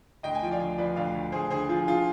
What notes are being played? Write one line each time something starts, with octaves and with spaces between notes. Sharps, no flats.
D2 D#5 G5
G#5
F3 G5
D5 F5
D2
F3 B4 D5
D2 D5 F5
D2
D2 G#4 C5
D3 G#4 C5
F3 F4 G#4
D3 F4 G#4